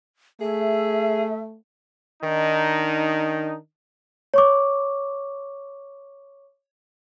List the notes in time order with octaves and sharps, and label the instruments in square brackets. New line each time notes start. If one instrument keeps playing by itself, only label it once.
[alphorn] A3 [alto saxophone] G#4 [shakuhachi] E5
[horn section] D#3 D4 D#4
[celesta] C#5 C#6 D6